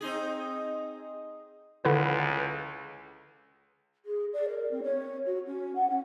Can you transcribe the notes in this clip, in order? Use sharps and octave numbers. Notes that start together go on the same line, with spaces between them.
C4 D#4 G#4
C#2 D3 E4 B4
G#4
D5
A#4
C4
C#5
F#4
C#4
F#5
C#4